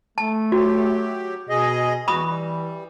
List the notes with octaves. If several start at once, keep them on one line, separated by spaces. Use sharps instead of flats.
A3 A5
F#3 F#4 G4
B2 G#4 D#5
E2 E3 F#4 B5 D#6
G3